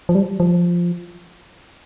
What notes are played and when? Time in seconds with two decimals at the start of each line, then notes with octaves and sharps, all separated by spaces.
0.09 F3
0.15 G3
0.40 F3